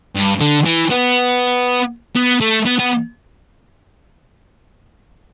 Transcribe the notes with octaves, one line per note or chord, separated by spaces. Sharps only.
G2
D3
E3
B3
B3
A3
B3
B3